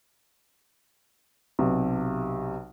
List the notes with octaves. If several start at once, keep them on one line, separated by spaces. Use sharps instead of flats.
B1 C3